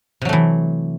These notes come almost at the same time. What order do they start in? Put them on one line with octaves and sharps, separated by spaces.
C3 F#3 A3 E3